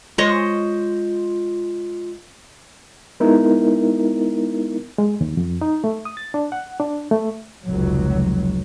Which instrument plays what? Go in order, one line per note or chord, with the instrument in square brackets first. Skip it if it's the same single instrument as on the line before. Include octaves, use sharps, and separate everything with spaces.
[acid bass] G#3 [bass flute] F4 [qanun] C5 C#5 D#5
[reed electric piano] G#3 B3 D#4 E4 A#4
G#3
D#2
F2
D#4
A3
D#6
A6
D4
F#5
D4
A3
[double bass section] F1 C#2 F#3